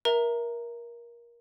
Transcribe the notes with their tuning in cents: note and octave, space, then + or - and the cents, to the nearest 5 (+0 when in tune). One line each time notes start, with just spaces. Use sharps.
A#4 +20 E5 +0 A#5 -5